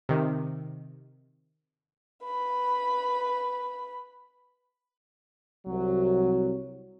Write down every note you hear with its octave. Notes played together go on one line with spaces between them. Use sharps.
C3 D#3
B4 B5
C2 F#3